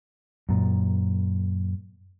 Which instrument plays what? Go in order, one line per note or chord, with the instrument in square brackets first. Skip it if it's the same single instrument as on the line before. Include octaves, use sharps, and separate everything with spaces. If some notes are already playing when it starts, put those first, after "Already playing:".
[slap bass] F#2 A#2